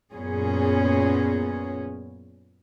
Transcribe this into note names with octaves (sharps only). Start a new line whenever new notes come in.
F#2 A#2 B3 C#4 G#4